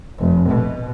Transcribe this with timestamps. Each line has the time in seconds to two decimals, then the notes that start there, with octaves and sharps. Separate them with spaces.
0.19 F1
0.49 B2